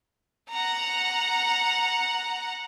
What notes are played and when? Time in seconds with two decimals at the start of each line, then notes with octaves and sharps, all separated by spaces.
0.50 F#5 A#5